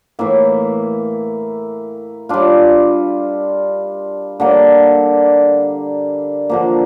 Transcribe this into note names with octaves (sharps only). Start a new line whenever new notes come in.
A2 E3 A#3 E4
G3 D4 F4
D3 G3 A#3 D4
D3 F3 A#3